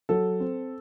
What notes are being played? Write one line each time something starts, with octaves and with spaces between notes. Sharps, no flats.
F#3 A4
C4